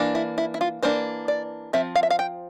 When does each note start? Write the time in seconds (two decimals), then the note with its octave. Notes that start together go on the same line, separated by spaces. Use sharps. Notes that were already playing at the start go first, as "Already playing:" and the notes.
Already playing: E3 A#3 D4
0.15 E4
0.38 E4
0.54 E4
0.61 F4
0.83 E3 A#3 D4 C5
1.28 D5
1.73 F3 C4 E5
1.95 F5
2.03 E5
2.10 F5
2.19 G5